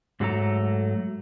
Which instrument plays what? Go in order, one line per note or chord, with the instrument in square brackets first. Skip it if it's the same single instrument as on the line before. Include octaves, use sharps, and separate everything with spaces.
[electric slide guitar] G#2 F#3 G3 A3 A4 A#5